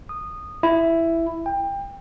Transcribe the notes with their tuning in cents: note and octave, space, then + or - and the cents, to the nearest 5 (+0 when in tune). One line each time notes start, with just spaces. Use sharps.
D#6 -15
E4 +5
G5 +25